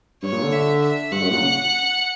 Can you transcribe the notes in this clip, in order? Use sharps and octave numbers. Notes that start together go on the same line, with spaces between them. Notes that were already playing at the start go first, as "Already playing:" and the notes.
G2 C#5
A#2
D3
E5
E5
G2 F#5
F#2
A#2
C#3